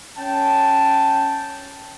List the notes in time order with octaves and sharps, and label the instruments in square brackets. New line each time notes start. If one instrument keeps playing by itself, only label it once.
[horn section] C#4 G5 A5